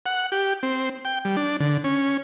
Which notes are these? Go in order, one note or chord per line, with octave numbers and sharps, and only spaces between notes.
F#5
G4
C4
G5
G3
D4
D3
C#4